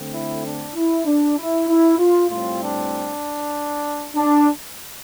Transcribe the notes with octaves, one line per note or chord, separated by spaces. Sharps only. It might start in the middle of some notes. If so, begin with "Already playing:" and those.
Already playing: D3 A3 C4
E4
D4
E4
D4
E4
E4
F4
A2 G3 C4 F4
D4
D4